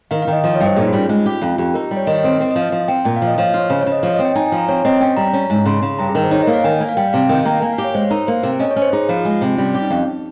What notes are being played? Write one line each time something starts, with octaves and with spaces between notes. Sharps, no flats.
D#3 F5
F5
D#3
D#5
F3 D#5
C#5
G2
C5
A#2 G#4
D#4
G3 F4
C#4
G#3 D#4
F4 G4
F2 F4
F2 G4
D#4 A#4
G3
C#5
D#3 D#5
C4 D#5
C4
F3 D#5
F5
F3
C4 G5
A#2 G5
F5
F3 D#5
F3 C#5
D#5
F4
C#5
C#3 C5
C#5
C#3
D#5
F3 C#5
D#5
C4
G5
D#4 G#5
G#5
F3
A#5
C4 C#5
C4 D#5
C#4 G5
G3 A#5
C#4
G#2
C#3 C6
C#3
G2 A#5
G#4
D#3 A#4
C5
D#4 C#5
D#5
A#3
F5
D#3 G#5
A#3
F5
G3 G5
C3 F5
D#3 G5
A#3 A#5
A#3 G#5
F5
G4
C#5
G#3 C5
D#4 A#4
A#3 C5
C3 A#4
C#4 D#5
C#5
C#4
C5
D#4 G#4
F3 F4
G#3
C3
G3 C#4
C4
C#4 G4
D#4
F2